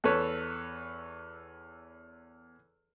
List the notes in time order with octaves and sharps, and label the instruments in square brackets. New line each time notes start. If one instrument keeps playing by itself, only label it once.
[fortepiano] E2 A4 B4 C#5